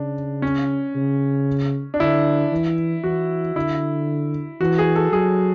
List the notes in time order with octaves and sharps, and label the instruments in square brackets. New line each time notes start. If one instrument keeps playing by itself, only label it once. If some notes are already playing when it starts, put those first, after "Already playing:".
Already playing: [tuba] C#3 [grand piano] D4
[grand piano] C#4
[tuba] C#3
[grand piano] D4
[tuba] D3 [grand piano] E4
[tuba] E3
[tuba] E3 [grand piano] F#4
[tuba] D3 [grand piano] E4
[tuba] E3 [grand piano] F#4
[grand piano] G#4
A4
[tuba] F#3 [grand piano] G#4